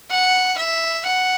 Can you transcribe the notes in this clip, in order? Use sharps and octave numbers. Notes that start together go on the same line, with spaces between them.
F#5
E5
F#5